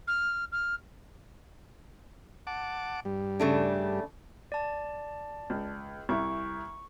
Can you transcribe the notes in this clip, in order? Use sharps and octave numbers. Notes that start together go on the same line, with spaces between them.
F6
F6
F#5 A5 D6
G2 G3
C#3 A3 D4
D5 A5
C#2
C2 E4 C#6